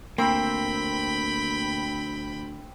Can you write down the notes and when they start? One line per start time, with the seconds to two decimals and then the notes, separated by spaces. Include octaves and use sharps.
0.18 D2 A#3 C4 G5 B5